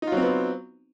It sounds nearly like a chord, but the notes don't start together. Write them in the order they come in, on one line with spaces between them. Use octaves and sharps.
D#4 F4 F#3 C4 B3